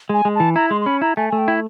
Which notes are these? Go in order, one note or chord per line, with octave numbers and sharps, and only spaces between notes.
G#3 G#5
G#3
E3 A5
E4 A#5
G#3 C6
C6
C#4 B5
E4 A#5
A3 G#5
A3 G#5
G5
E4